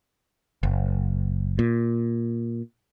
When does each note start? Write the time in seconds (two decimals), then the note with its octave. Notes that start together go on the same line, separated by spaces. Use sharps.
0.63 F#1
1.59 A#2